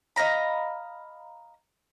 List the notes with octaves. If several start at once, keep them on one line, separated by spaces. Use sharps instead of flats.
D#5 F5 A#5 B5